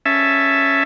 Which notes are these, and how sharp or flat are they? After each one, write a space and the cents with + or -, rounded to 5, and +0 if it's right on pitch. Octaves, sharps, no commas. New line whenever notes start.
C#4 +0 E5 +0 A5 +0